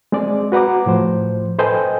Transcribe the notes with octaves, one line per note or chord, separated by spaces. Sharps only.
G#3 C4 G#4 D5
F#4 B4 F#5 A#5 D6
A2 F3 C5
A4 B4 C5 D#5 G5 G#5